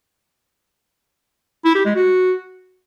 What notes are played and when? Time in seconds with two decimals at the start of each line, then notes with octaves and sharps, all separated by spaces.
1.65 E4
1.75 G4
1.85 G#3
1.96 F#4